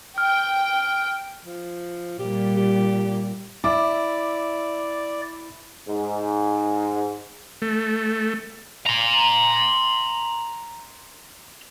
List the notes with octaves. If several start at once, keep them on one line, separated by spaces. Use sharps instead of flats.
G5 F6
F3
A#2 G3 G4
G4
E4 D5 E5 D6
G#2
A3
A#5 C6